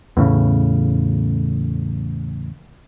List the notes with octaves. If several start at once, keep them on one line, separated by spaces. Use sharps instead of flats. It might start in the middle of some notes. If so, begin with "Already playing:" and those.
E2 A2 C#3